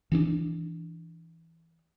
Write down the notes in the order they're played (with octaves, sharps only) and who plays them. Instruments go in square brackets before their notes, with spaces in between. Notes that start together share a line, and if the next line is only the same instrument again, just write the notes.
[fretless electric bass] E3 C#4 D4